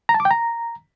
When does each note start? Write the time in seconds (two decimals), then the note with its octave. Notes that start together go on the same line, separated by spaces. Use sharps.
0.09 A#5
0.14 A5
0.20 D6
0.25 G5
0.31 A#5